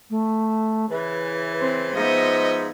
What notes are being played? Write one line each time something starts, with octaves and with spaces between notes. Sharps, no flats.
A3
C#3 E3 B4
C4 C5
G#2 F3 B3 D#5 E5